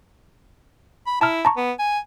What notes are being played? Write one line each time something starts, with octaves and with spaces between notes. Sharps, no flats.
B5
E4 A5 A#5 F6
A5 A#5 C#6
B3
G#5